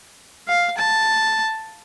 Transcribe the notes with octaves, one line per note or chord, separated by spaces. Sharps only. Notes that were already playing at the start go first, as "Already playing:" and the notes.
F5
A5